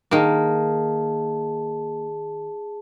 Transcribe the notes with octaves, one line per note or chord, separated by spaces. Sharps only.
D#3 A#3 G#4 A5